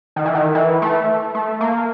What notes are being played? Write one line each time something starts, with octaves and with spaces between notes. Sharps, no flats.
D#3
E3
D#3
E3
A3
A3
A#3